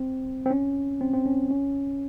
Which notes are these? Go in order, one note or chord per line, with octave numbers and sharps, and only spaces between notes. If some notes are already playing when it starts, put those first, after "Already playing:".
Already playing: C4
C4
C#4
C4
C4
C#4
C#4